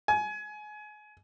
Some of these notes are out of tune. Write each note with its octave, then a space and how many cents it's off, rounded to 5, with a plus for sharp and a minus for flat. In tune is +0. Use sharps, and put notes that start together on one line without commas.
G#5 +25